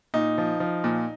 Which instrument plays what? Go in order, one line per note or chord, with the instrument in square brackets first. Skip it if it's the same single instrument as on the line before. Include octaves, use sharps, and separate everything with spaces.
[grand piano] A#2 D#4
F3
F3
A#2